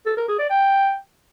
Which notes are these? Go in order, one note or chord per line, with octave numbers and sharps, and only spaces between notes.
A4
A#4
G#4
D5
G5